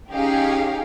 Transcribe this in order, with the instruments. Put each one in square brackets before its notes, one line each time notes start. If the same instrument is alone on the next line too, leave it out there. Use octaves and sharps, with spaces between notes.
[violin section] C#4 D#4 G4 G#4 F5 G5